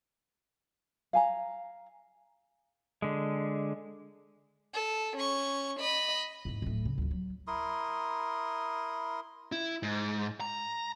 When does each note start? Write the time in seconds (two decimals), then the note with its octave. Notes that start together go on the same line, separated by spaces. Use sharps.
1.13 F5 G#5 A#5
3.02 D3 G#3
4.74 A4
5.16 C#4 C#6
5.79 D#5 B5
6.45 E2 G#2
6.62 D1 A2
6.85 C#3
6.98 D2 F3
7.11 F#3
7.47 E4 A#4 C6 D#6
9.52 E4
9.83 G#2
10.41 A#5